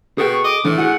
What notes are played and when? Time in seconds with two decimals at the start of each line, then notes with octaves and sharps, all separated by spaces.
0.18 B2 G#4 A4 G5
0.31 C#6
0.44 D#5 D6
0.65 A2 E3 D4
0.77 E4 F#4 G#4 F#5